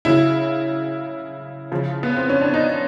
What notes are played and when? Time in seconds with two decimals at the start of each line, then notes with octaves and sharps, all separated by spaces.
0.05 C#3 F#3 E4
1.72 C#3 F3
2.03 B3
2.17 C4
2.30 C#4
2.41 D4
2.54 D#4